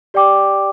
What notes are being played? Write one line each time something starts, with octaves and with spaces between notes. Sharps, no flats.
G4 D5 G5 D6